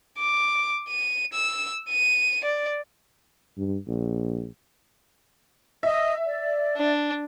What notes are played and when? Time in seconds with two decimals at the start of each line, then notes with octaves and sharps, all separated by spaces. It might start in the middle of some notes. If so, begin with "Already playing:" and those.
0.19 D6
0.88 D#7
1.33 E6
1.89 D#7
2.44 D5
3.57 G2
3.88 A#1
5.83 D#5 E5
6.25 D5
6.77 D4